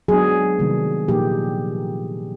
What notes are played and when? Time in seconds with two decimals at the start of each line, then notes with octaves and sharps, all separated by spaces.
0.08 F#3 B3 D4 G#4
0.59 C3 D#3 G3 A#3
1.08 A#2 F3 A#3 D#4 G4